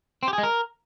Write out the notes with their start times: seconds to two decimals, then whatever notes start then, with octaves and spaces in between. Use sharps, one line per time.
0.23 C4
0.28 G4
0.33 G#4
0.38 G#3
0.43 A#4